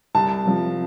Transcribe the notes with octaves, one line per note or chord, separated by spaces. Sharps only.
C2 A5
C3 F3